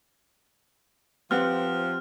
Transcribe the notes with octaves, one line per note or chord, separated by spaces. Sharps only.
F3 C4 G4 B4 F#5 F6